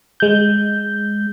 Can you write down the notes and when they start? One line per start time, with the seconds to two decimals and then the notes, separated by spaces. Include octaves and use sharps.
0.20 G#3 G6